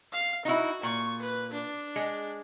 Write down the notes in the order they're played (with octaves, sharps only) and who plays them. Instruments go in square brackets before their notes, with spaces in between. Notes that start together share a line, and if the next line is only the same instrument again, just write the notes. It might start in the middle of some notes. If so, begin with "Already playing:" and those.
[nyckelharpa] F5
[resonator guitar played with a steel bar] D#4 E4 [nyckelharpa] F#4
[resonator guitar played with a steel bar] A#2 [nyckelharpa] C#6
[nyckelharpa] B4
D4
[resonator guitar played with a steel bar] G#3